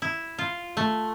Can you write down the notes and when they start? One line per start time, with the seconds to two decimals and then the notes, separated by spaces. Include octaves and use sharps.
0.02 E4
0.39 F4
0.77 A3